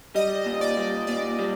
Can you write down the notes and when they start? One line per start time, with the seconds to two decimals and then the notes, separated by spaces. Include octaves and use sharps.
0.15 G3 D#5
0.46 A#2
0.61 D5
0.77 G3
1.07 A#2 D5
1.39 G3